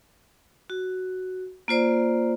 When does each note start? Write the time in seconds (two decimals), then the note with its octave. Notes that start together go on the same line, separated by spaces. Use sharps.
0.70 F#4
1.68 A#3 F4 C5 D5